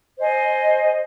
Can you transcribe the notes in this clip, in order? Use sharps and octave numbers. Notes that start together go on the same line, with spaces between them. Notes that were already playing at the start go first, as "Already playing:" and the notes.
C5 D#5 G#5